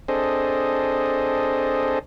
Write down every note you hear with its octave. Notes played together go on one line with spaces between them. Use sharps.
C4 D4 G#4 A4 C5 D#5